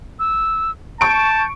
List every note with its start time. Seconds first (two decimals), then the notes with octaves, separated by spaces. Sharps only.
0.19 E6
1.01 A5 C#6 G6 D7